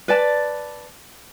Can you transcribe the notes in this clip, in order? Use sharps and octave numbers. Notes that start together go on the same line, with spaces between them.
B4 D5 A5